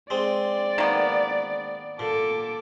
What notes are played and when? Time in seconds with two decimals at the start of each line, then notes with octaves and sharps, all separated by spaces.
0.10 G#3 C4 D5
0.78 D#3 A#3 B3
1.99 A#2 A4 D6